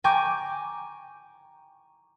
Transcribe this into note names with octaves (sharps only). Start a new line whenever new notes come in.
G5 G#5 A#5 C#6 D6 G6